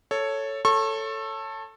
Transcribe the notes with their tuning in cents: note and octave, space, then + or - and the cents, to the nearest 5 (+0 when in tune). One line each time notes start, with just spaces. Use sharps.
A4 +5 C#5 +0
A4 +10 C#5 +0 C#6 -30